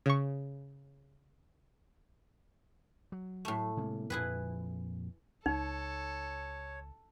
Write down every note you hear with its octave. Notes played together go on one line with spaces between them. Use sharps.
C#3 C#6
F#3
A2 A3
C3 G#3 A#3
F2 A#2 F3 E4 G#4 B4
C#2 D#4 A4 C#5